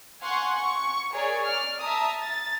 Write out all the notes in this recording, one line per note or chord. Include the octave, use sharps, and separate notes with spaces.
F5 F#5 G#5 C6 C#6
C#6
G#4 A#4 C#5 D5
D5 F6
E5 A5 A#5 D#6
A6